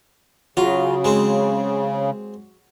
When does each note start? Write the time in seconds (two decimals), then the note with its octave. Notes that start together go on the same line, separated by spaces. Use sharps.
0.57 C#3 F#3 F4
1.04 G#3 C4